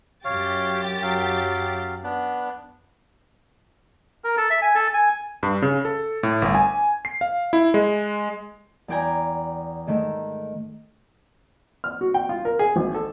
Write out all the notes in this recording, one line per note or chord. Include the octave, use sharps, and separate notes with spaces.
F#2 G4 C#5 F5 A6
F#3 F5
B3 D4
A#4
A4
E5
G#5
A4
G#5
G2
C#3
A4
A2
G1
G#5
C7
F5
E4
G#3
E2 E4 D5 G5 G#5 A#5
G#2 D#3 A3
F6
F#4
G5
F4
A#4
G#4
G#1
A4